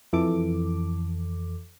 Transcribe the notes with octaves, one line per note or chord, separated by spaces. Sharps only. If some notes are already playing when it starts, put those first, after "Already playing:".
F2 E3 A4 D6